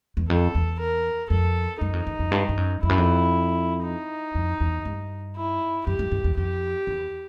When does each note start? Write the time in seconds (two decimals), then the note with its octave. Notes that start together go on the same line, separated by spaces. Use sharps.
0.17 E2
0.29 F2 A4
0.55 E2
0.80 A#4
1.30 F2 A4
1.81 F#2 D#4
1.93 F2
2.07 E2
2.19 F2
2.32 G2
2.49 G2
2.57 F#2
2.82 F2 E4
2.89 F#2
2.98 F2
3.84 D#4
4.35 F2
4.60 E2
4.85 G2
5.36 E4
5.87 F#2 G4
5.99 F#2
6.12 G2
6.24 E2
6.37 F2 G4
6.87 E2